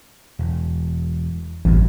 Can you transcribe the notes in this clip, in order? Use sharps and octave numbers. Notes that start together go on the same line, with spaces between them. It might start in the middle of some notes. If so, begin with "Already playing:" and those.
E1
A1 E2 G2 A#2